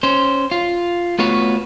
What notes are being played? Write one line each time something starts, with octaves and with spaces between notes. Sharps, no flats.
C#4 C5
F4
A3 B3 F4 F#4 B4 C#5